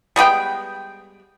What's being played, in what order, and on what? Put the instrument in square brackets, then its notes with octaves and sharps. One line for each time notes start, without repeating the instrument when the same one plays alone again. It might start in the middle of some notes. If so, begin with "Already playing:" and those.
[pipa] G3 G#3 B3 G5